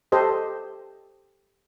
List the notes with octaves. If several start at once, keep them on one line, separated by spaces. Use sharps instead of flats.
G4 A4 C5 D#5